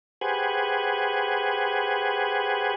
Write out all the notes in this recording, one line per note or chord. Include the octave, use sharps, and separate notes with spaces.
G4 G#4 B4 C5 F#5 G#5